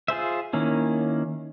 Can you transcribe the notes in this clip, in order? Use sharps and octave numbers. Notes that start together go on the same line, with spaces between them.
F4 G#4 C5 E5
D#3 A#3 C#4 E4